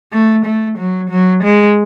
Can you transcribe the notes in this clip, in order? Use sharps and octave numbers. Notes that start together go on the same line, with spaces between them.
A3
A3
F#3
F#3
G#3